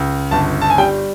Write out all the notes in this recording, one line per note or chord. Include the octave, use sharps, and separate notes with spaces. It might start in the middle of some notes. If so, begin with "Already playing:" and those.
Already playing: C#2
G1 A5
A5
G#5
G3 G5